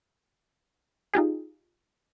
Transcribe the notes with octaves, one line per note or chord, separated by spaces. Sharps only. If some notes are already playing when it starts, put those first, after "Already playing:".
D#4 F4 G4 G#4